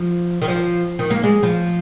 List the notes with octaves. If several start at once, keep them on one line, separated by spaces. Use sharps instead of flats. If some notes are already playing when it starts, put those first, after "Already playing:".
Already playing: F3
D#3
F3
D#3
A#3
G#3
F3